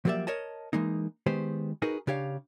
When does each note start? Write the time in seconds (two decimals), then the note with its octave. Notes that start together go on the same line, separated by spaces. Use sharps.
0.05 F3 F#3 A#3 G4 D5 E5
0.27 A#4 C#5 D#5 A5
0.73 E3 G#3 A#3 D#4
1.26 D#3 G#3 B3 G4 B4 C5
1.82 D#4 F#4 G#4 A#4 B4
2.07 C#3 D4 G4 C#5 F5